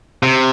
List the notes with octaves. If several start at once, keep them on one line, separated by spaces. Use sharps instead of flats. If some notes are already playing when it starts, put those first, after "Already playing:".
C3